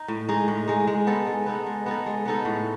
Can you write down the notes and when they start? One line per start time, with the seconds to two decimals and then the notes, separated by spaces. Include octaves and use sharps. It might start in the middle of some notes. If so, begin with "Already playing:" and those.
Already playing: D#4
0.08 A2
0.29 G#3 D#4
0.48 A2
0.68 G#3 D#4
0.87 G#3
1.07 B3 D#4 A4
1.27 G#3
1.46 B3 D#4 A4
1.66 G#3
1.86 B3 D#4 A4
2.06 G#3
2.25 B3 D#4 A4
2.45 A2